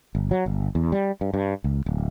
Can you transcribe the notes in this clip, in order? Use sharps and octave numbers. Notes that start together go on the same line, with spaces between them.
G1
F#3
G1
E2
G3
G2
G2
C#2
D1